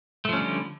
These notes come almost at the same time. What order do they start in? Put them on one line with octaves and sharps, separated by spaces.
A3 F3 C#4 G3 D3